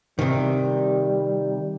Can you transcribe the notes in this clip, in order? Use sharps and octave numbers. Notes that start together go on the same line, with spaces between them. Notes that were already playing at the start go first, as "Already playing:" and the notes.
C3 D#3 G3